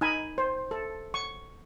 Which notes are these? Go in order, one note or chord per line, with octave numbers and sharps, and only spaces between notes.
D#4 G#5 B5
C5
A4
C#6